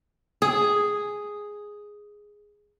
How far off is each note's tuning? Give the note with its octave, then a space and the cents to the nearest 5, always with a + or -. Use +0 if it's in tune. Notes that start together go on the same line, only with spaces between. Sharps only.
G#4 +0